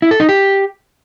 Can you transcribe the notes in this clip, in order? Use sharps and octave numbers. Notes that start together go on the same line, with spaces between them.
E4
A4
D#4
G4